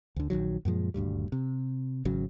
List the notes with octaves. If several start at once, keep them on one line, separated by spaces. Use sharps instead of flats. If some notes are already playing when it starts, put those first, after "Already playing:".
D2 D3
A#1 D#2 D#3 F#3
F#2 A#2 F3 G#3
D#1 D2 G2 G3
C3
G#1 C#3 F#3